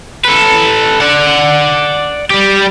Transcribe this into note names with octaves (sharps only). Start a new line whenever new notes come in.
A4 B4
D5 F#5
G3 G4